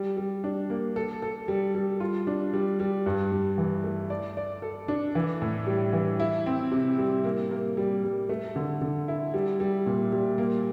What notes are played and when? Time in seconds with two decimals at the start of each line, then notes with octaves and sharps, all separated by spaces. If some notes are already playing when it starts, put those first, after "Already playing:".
Already playing: G3
0.17 G3
0.44 D4
0.70 A#3
0.96 A4
1.22 A4
1.48 G3
1.75 G3
2.00 F4
2.27 D4
2.54 G3
2.80 G3
3.06 G2
3.32 G2
3.58 E3
3.84 A3
4.10 D5
4.37 D5
4.62 A4
4.88 D4
5.15 E3
5.42 A2
5.67 G3
5.93 E3
6.20 E4
6.46 C4
6.71 C3
6.98 G3
7.24 A#3
7.51 A#3
7.77 G3
8.04 G3
8.29 A3
8.56 D3
8.81 D3
9.08 E4
9.34 G3
9.60 G3
9.86 A#2
10.12 G3
10.38 A#3